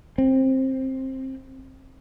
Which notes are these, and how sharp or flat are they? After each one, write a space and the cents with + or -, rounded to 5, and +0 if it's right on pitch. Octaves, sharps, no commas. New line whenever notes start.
C4 +15